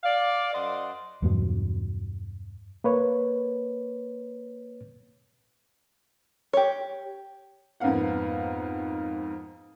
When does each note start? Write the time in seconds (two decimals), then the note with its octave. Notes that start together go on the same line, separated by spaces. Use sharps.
0.04 D5 F5
0.54 F#2 C5 D5 D#5 F#5
1.22 E2 G2 B2 F#3
2.84 A#3 B4 C#5
6.53 G4 C#5
7.80 F2 G#2 A#3 B3 F5 F#5